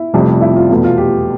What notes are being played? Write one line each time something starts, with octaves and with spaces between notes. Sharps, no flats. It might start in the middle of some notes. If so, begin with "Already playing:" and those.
Already playing: E4
F1 F2 C3 G3
E4
F4
E2 B2 A3 E4
F4
G4